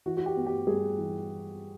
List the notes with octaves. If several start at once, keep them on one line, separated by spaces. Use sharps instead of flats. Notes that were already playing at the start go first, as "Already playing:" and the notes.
E3 F#4
F#4
G4
B3
G4
G3 G#4
E3